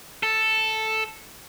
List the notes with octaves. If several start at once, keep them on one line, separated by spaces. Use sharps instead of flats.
A4